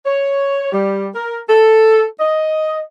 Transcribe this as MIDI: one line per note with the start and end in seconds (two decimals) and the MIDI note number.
0.05 0.68 73
0.72 1.09 55
1.15 1.41 70
1.49 2.05 69
2.19 2.79 75